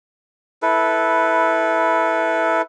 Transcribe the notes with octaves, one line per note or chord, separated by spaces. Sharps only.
E4 A4 B4